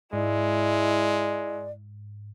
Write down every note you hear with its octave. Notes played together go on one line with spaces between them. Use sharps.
G#2 G#3 E4 D5